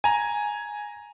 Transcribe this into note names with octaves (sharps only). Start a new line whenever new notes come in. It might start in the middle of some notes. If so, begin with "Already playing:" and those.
G#5 A#5